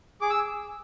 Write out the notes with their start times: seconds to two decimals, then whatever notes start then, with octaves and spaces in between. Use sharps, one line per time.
0.21 G#4 D6
0.30 E6